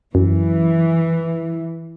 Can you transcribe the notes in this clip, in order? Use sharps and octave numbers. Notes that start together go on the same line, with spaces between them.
F#2 E3